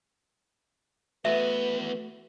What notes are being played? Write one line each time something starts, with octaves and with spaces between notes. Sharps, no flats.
E2 A3 B3 F#4 B4 E5